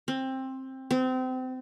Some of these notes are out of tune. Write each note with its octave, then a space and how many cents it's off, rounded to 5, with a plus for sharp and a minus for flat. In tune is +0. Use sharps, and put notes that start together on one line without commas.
C4 +15
C4 -30